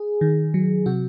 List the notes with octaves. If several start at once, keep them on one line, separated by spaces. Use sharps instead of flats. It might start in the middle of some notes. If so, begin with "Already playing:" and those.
Already playing: G#4
D#3
F#3
C3 F#4